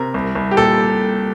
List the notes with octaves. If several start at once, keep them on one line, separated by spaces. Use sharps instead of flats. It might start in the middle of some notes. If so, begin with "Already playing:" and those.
Already playing: C3 A#4
C2
C2
G4
A#2 A4